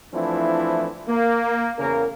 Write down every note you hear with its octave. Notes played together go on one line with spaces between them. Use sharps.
E3 F3 A3 C4 D4 E4
A#3
E2 C#3 A#3 A#4